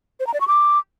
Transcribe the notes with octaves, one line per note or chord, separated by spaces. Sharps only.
C5
A#5
D5
C#6
D6